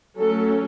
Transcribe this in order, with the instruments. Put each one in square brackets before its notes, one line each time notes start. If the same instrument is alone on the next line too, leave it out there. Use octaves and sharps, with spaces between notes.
[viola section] F#3 A3 C#4 A4